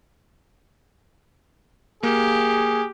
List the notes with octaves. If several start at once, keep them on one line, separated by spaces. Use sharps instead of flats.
A#3 G4 G#4